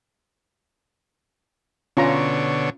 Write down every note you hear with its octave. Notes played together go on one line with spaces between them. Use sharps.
B2 D3 C#4 F4 C#5 A#5